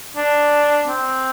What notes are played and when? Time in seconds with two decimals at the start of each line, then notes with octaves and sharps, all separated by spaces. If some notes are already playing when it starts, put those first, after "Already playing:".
0.17 D4
0.87 C4